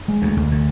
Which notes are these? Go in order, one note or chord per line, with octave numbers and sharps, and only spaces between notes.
G#3
D2
D2
D3